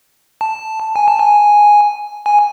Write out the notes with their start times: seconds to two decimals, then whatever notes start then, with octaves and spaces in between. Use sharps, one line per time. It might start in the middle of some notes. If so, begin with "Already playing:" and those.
0.41 A5
0.96 G#5
1.08 A5
1.19 G#5
2.26 G#5